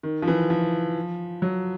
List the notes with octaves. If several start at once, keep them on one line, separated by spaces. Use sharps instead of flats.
D#3
F3
E3
F3
F#3